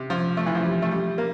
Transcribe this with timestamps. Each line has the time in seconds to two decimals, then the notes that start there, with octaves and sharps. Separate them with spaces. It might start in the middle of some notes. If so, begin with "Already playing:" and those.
Already playing: C3
0.10 F3
0.37 A3
0.46 E3
0.55 F3
0.64 G3
0.82 A3
0.91 G3
1.18 A#3